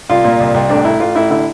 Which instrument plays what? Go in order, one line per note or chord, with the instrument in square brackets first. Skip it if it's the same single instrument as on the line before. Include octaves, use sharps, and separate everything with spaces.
[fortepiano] C2 F4
A#2
C2
C2
A1 D4
A1 E4
A1 F4
A1 E4
D3 E4